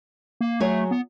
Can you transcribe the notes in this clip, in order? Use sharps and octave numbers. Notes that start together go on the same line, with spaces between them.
A#3
F#3 A3 G#4 C#5
B3